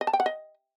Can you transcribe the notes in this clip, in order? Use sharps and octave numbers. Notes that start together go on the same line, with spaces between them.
D#5
A5
G5
F#5
D#5